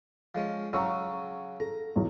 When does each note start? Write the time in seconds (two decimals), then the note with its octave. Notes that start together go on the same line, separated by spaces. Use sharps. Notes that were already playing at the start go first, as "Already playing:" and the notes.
0.35 F3 G#3 C#4
0.73 C#3 F#3 C#4 A#5 C#6 E6
1.60 A4 A#5
1.96 B1 E2